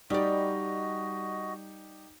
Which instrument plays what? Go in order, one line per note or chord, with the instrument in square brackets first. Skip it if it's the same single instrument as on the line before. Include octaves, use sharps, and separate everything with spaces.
[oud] G3 D5 [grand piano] D#4 G4 [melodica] F#4 D#5